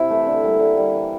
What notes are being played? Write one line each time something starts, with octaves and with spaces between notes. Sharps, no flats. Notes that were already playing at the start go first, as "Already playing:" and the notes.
Already playing: C3 E4
E3 A3
D3
G3 A#3
D3
G3 A#3
E3